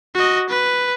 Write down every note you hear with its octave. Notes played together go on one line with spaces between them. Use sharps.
F#4 D#5
B4